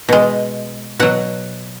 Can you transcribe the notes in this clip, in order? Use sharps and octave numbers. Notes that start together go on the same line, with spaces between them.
B2 G#3
B2 F#3 F#5